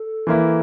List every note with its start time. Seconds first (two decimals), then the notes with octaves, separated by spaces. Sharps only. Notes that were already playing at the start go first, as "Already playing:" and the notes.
Already playing: A4
0.27 E3 A#3 E4